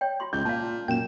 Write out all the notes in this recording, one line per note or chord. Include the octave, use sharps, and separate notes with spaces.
C#5 G5
F4 F#4 C6
C#2 G6
A#2 F5 A5
F#2 A#2 G5 E7